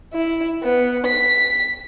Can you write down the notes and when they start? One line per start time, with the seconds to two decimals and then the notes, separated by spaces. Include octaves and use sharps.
0.14 E4
0.63 B3
1.06 B6